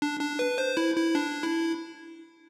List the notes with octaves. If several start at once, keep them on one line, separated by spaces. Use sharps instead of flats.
D4
D4
B4
C5
E4
E4
D4
E4